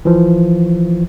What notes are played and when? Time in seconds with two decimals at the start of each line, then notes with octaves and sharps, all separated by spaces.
0.05 E3 F3